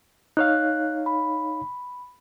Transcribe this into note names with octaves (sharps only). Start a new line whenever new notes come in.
D#4 C#5 F5 F#6
B5